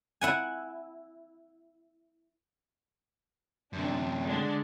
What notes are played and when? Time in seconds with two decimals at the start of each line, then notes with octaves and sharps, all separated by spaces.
0.21 E4 F#5 G#5
3.73 F#2 C3 D4
4.23 D3 G#3 D4